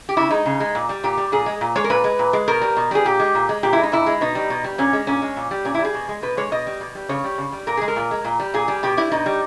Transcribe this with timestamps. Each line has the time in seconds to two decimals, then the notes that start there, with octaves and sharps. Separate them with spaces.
0.09 G4
0.17 C#3 E4
0.31 G#3 D#4
0.46 C#3
0.60 G#3
0.75 A#2
0.89 G3
1.04 A#2 G4
1.17 G3
1.32 A#2 G#4
1.46 G#3
1.61 A#2
1.76 G#3 C#5
1.84 A#4
1.90 A#2 B4
2.04 G#3
2.19 A#2
2.33 G#3
2.48 B2 A#4
2.61 G3
2.77 B2
2.91 G3 G#4
3.05 A#2 G4
3.20 G#3
3.35 A#2
3.49 G#3
3.63 A#2 G4
3.73 G#3 E4
3.83 D#4
3.92 A#2 E4
4.06 G#3
4.21 B2 D#4
4.35 G3
4.50 B2
4.64 G3
4.78 A#2 C#4
4.93 G#3
5.07 A#2 C#4
5.22 G#3
5.36 A#2
5.51 G3
5.65 A#2 C#4
5.74 E4
5.79 G3
5.85 G#4
5.94 B2
6.09 G#3
6.23 B2 B4
6.37 G#3 C#5
6.52 B2 D#5
6.67 G3
6.81 B2
6.95 G3
7.09 C#3 C#5
7.24 G3
7.38 C#3
7.52 G3
7.67 A#2 A#4
7.77 G#3 G#4
7.88 A#4
7.96 A#2
8.11 G#3
8.25 A#2
8.40 G3
8.54 A#2 G#4
8.68 G3
8.83 B2 G4
8.97 G3 E4
9.12 B2 D#4
9.26 G3